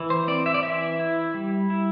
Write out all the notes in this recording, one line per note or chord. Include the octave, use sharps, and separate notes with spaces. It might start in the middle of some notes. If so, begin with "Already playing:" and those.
Already playing: E3
C5
C4 D5
E5
D5
E3 E5
E4
G3
E4